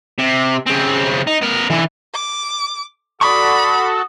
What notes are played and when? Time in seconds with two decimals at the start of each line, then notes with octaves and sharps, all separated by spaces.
0.18 C3
0.66 C#3 C4
1.27 D#4
1.42 B3 A#4
1.70 D3 E3
2.14 D6
3.21 F#4 A4 D5 B5 C#6 D#6